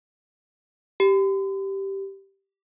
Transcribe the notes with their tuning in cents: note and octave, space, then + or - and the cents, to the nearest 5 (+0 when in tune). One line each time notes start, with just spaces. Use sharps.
G4 -10